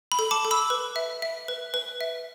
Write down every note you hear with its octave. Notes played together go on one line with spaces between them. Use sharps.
B5
A4
A5 D6
A4
B5 E6
B4
E5
E5
B4
B4
E5